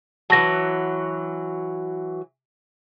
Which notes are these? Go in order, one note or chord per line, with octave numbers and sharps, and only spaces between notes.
E3 F#3 A5 A#6